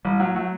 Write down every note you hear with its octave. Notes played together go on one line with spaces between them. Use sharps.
A1 G3
F#3 A3
F#3 A3